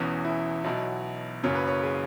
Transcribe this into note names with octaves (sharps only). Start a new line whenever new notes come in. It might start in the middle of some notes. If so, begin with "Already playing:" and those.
Already playing: E1 E2 E3 C#4
E4
B1 B2 F#3 E4
F#1 F#2 C#3 C#5
B4
C#5
G#4